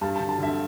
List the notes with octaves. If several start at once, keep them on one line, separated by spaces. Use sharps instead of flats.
G2 A5
A5
D3
A5
D3 E5